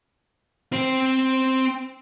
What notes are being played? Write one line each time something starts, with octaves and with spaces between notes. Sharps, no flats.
C4 C5